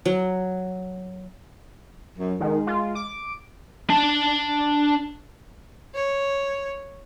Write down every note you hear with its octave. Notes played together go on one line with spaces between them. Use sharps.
F#3
F#2
D#3 G#3
F4
D6
D4 A5
C#5